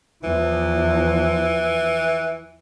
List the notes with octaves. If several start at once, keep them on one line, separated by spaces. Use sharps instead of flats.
E2 E3 F3